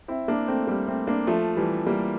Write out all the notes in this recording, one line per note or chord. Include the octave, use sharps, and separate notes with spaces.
C4 E4
A#3 D4
A3 C4
G3 A#3
A3 C4
A#3 D4
F3 A3
E3 G3
G3 A#3